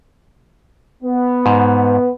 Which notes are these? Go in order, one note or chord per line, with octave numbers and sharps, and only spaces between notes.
B3
G#2